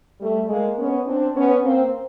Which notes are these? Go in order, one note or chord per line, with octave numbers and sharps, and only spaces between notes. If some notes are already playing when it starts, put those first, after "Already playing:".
G3 A3
G#3 A#3
B3 C#4
C4 D4
B3 C#4
A#3 C4